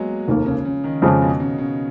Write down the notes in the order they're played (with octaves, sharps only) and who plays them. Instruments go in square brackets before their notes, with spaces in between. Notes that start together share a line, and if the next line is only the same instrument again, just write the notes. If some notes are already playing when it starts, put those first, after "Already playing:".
Already playing: [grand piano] F#3 G#3 A#3 B3
[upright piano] F1 D#2 D#3 A#3 [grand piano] F3
[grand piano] C#3
C#3
D#3
[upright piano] F2 C#3 F3 G#3
[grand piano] B2
C#3
C#3